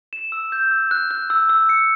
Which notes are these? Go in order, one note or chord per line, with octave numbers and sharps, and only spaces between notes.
E7
E6
G6
E6
F#6
F#6
E6
E6
C#7